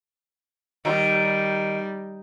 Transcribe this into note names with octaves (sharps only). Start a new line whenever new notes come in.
D#3 G3